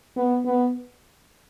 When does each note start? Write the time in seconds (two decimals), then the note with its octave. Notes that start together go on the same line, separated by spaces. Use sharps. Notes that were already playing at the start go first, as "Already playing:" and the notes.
0.17 B3
0.46 B3